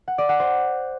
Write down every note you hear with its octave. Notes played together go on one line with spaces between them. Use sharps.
F#5
D5
F#5
C5